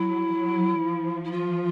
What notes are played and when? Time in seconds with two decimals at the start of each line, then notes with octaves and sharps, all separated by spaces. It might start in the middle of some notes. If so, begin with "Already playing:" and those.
Already playing: F#3 E4
0.34 F#3
0.82 F3
1.24 E4
1.31 F4